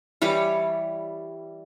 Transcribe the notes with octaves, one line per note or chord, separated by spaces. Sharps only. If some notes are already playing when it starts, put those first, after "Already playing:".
E3 G3 C#5 D6